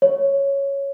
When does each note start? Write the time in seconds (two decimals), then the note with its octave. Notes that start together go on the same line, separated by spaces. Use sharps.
0.02 C#5